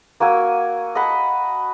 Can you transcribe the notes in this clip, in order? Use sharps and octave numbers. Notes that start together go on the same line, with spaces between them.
A#3 F#4 G#5 E6
D#5 F#5 A5 B5